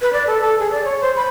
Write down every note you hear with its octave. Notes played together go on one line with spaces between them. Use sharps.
B4
D5
A4
A4
G#4
D5
C#5
C5
B5